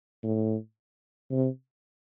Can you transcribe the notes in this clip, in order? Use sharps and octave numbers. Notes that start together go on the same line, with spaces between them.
A2
C3